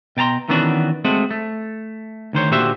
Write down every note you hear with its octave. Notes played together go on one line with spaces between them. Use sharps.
B2 G5 A5 A#5 C6
D#3 E3 B3 C#4 D4 F#4
G#3 A3 C4 F#4
A3
D2 D#3 C5 C#5
A#2 D3 F#4 G4 C5 E5